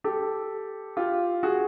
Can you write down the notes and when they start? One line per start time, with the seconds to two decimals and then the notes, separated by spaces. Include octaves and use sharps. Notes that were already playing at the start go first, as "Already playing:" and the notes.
0.04 G4 A4
0.97 F4 G4
1.43 F#4 G#4